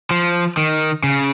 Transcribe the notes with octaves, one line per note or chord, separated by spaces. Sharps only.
F3
D#3
C#3